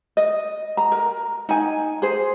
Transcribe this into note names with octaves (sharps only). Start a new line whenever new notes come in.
D#5
A#5
A#4
D#4 G#5
G#4 C5